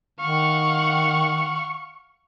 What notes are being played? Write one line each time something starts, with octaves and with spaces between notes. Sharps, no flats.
D#3 F5 F#5 C#6